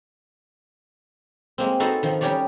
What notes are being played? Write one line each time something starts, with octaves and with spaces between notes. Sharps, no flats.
G#3 A#3 C4
D#4 F#4 A4 B4 C5 F#5
D#3 F3
G3 C#4 D#4 G4 C#5 D5